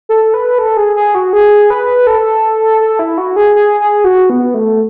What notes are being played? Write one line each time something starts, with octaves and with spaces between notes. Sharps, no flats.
A4
B4
A4
G#4
G#4
F#4
G#4
B4
A4
A4
E4
F#4
G#4
G#4
G#4
F#4
B3
A3